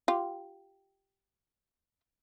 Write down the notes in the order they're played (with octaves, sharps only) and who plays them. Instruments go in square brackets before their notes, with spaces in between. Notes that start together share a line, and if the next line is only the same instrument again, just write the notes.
[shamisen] F4 G4